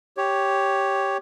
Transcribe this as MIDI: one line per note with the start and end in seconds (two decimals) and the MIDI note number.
0.17 1.18 67
0.17 1.18 73